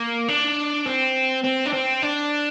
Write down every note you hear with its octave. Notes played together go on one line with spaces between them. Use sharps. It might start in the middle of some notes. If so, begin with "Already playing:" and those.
Already playing: A#3
D4
C4
C4
D4
C4
D4